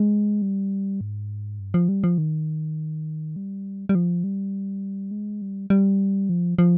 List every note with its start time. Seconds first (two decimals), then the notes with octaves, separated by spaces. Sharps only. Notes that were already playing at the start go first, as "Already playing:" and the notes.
Already playing: G#3
0.42 G3
1.01 G#2
1.60 G2
1.74 F3
1.89 G3
2.04 F3
2.18 D#3
3.36 G3
3.89 G3
3.95 F3
4.24 G3
5.11 G#3
5.42 G3
5.70 G3
6.29 F3
6.58 F3